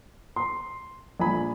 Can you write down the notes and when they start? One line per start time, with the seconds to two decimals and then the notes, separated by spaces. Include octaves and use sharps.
0.36 C6
1.20 A#1 G#5 B5